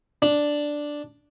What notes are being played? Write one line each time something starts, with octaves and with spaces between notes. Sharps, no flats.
D4